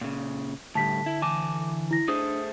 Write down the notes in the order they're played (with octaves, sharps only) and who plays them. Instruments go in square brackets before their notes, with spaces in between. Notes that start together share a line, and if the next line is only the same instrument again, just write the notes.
[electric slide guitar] A#2 C#3
[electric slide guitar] A2 G3 [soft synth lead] D3 [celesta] A5 B6
[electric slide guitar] E4
[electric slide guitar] E3 G#5 A5 [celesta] D6
[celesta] E4 A#6
[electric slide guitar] A3 G#4 C5 [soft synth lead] D4 [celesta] D#6